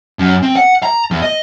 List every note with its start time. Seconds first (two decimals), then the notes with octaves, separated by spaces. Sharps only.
0.19 F#2
0.42 C4
0.56 F#5
0.83 A#5
1.11 E2
1.22 D#5